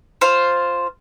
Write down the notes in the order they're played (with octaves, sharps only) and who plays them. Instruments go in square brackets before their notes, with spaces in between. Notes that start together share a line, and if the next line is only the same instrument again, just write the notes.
[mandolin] F4 C5 F5